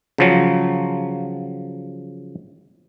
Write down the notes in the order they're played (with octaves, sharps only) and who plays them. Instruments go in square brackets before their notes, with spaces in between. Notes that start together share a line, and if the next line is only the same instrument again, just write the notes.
[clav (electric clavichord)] C#3 F3 F#3